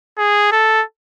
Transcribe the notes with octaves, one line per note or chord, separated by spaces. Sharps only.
G#4
A4